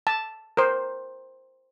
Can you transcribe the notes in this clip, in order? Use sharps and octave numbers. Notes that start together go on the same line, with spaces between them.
A5
A#4 C5